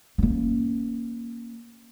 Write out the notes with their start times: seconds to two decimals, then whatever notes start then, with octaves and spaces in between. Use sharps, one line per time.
0.18 A#3 C#4